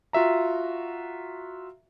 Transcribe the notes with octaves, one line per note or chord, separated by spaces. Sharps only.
F4 F#4 E5 A#5